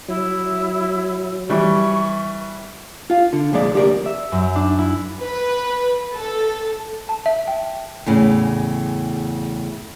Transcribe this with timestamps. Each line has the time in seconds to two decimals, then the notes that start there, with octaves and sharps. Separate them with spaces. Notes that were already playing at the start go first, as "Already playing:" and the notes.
0.08 F#3 E4
1.49 E3 G3 C#6
3.10 F4 F5
3.33 D3
3.52 C2 F2 A#2 G#3 D5
3.74 D2 G4 A#4 D5
4.05 E5
4.32 F#2
4.56 D4
4.78 E4
5.21 B4
6.14 A4
7.09 A5
7.26 E5
7.48 G5
8.06 E2 A2 C#3